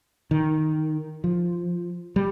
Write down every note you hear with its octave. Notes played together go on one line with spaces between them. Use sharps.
D#3
F3
G3